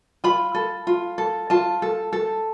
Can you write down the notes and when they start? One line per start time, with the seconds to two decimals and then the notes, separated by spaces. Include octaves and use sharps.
0.24 F4 B5
0.54 A4
0.87 F4
1.18 A4
1.50 F4 A5
1.82 A4
2.13 A4